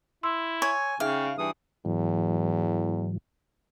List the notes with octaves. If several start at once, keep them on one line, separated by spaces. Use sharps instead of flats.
E4 C6 E6
C#5 G#5
C#3 D#4 G#4 E5 F5 G5
G2 E3 D#6
E2 G#2 E3 F#3